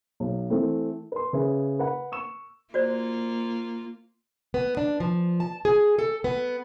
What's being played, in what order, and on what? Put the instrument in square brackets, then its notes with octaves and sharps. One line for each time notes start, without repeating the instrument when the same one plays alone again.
[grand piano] B1
E3 A3 C4
B4 C6
C#3 G#4 B4 E5
B4 F#5 B5
C#6 E6 E7
[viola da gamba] A#3 F4 [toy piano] F#4 C5 D5
[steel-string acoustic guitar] B3
D4
F3
A5
G#4
A4
B3